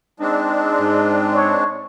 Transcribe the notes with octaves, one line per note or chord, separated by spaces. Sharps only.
G#3 C4 D4 D#4
G#2
C#5